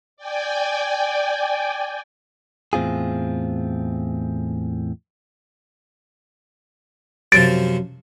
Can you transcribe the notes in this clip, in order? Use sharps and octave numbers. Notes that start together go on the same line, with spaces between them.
D5 G5 G#5
E2 A2 C4 F4 G#4
F#2 C3 F3 A6 D7